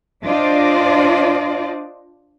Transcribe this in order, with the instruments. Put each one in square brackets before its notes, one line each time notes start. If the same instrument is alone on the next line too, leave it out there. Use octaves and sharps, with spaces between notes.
[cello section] D4 F4 C5 D5 D#5